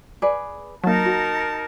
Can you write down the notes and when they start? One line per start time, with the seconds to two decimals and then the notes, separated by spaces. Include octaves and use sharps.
0.22 G#4 B4 D5
0.84 F#3 A#3 D#4 A#4 A5
1.05 F#4